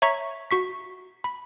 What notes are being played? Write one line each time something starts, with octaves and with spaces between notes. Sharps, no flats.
C#5 E5 A#5 C#6 G#6 B6
F#4 C#6 B6
B5